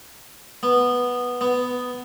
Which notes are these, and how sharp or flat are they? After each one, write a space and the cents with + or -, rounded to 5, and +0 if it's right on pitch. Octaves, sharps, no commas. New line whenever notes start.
B3 -5
B3 +10